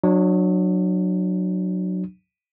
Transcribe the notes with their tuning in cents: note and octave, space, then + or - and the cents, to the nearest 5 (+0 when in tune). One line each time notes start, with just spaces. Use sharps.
F#3 -10 D4 +30